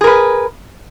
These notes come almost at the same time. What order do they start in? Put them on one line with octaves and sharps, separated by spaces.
G#4 A#4 B4